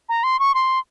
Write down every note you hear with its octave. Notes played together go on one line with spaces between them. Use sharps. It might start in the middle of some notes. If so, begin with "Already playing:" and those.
A#5
C6
C#6
C6